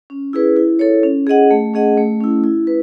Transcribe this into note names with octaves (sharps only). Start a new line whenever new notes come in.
C#4
E4 G#4 B4
E4
A4 C#5
C#4
G#4 D#5 F#5
A3
C#4 G#4 D#5 F#5
A3
C#4 E4
E4
B4